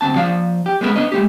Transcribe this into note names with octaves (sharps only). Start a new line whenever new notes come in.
D2 C4 A5
F3 D5 F5
G4
G#3 A3 B3 C#4 A#4 B4
B3 D4 C#5 D#5
G#3 A3 G4